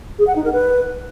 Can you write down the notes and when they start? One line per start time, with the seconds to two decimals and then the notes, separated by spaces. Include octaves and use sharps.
0.19 G#4
0.27 F#5
0.36 D#4
0.44 A#4
0.53 B4